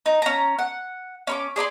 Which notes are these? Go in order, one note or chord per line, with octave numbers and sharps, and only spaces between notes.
D#4
C#4 A#5
F#5
C#4 B5 D6
G#4 D5 B5 C6